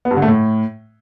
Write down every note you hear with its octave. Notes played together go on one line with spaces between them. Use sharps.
B3
G2
D3
A3
A2